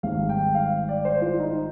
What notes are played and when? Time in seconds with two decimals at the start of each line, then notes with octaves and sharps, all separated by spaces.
0.03 G#1 G#2 D#3 G3 F5
0.29 G5
0.55 F5
0.89 D5
1.05 C5
1.22 F4
1.40 D#4